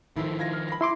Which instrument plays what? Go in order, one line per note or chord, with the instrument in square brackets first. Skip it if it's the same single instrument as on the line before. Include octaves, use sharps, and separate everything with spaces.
[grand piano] A2 E4 [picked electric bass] D#3 F3
[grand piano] F4 G#6 A#6
F6
B5 A#6
[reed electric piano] E4 C6 D6